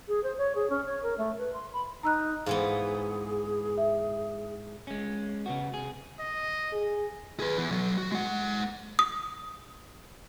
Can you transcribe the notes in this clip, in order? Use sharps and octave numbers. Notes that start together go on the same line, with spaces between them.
G#4
C5
C#5
G#4
C#4
C#5
A#4
A3
B4
C6
B5
D#4 A#5 E6 F#6
G#2 E3 B3 G#4 F5
E5
G#3 C#4
C#3 B3 F#4
C3 G#4
D#5
G#4
G#4 B4
E3 B3
B1 F#3
F#4
G#3 F#5
D#6